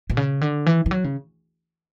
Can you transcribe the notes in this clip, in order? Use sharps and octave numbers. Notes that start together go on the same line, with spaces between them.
B2
C#3
D3
E3
E3
F#3
C#3